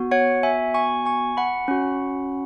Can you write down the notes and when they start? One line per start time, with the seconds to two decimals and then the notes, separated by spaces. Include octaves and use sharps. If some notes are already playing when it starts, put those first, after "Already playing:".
Already playing: B3 F#4
0.11 C#5 F#5
0.43 E5 G#5
0.74 G#5 C#6
1.06 G#5 C#6
1.37 F#5 B5
1.68 C#4 F#4